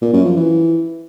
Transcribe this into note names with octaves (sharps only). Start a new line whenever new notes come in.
A#2
F#2
F3
E3